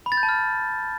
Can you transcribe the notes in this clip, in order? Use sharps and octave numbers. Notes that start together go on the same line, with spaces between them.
B5
A6
G6
A5
F6